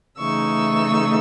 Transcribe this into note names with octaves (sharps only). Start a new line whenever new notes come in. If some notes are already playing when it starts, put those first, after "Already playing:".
C#3 E3 A3 D#4 C#6 E6